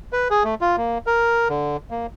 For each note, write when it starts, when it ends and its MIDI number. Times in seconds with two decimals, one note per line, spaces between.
0.13 0.28 71
0.30 0.43 68
0.44 0.55 57
0.61 0.76 65
0.77 0.98 58
1.07 1.48 70
1.49 1.77 50
1.91 2.06 58